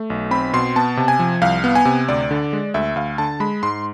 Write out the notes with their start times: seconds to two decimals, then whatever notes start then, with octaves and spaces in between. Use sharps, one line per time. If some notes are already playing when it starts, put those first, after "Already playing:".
Already playing: A3
0.10 B1
0.31 C4 B5
0.53 B2 C6
0.76 B3 A5
0.97 C3
1.08 G#5
1.19 F3
1.41 C2 F5
1.64 B3
1.75 G#5
1.85 C3
2.08 D2 D5
2.31 D3
2.53 G#3
2.74 D2 E5
2.96 D2 F5
3.18 D3 A5
3.40 G#3 B5
3.63 G#2 C6